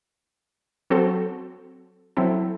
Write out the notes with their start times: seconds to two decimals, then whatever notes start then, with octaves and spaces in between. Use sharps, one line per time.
0.90 F#3 C4 F#4 A4
2.17 F#3 C4 E4 A4